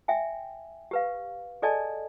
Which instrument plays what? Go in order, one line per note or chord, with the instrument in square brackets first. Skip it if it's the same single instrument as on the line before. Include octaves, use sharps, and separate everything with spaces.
[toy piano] E5 G5 G#5
G4 B4 F5
G#4 A4 D5 D#5 G#5 A5